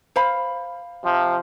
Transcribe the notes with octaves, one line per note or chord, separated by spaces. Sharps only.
C5 F5 B5
C3 F3